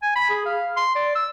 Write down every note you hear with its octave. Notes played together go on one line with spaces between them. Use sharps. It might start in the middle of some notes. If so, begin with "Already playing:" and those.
G#5
B5
G#4
F5
C6
D5
E6